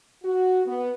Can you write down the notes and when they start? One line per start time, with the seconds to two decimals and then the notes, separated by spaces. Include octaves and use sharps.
0.24 F#4
0.66 B3